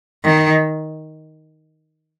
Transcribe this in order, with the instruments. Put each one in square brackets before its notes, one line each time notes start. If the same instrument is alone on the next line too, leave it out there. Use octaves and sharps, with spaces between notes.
[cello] D#3